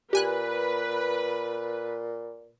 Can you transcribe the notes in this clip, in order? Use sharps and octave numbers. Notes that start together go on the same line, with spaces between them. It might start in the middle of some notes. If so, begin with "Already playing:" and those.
A#2 G4 B4 G#5 F#6